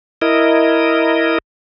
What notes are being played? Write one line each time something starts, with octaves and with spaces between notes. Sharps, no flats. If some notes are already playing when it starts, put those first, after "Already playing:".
E4 A#4 D#5